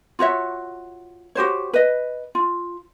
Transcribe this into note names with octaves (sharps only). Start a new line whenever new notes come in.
F4 F#4 C#5 E5
F#4 G4 C5 C#5
B4 D#5
F4